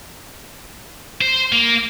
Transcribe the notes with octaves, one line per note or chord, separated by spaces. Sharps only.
C5
A#3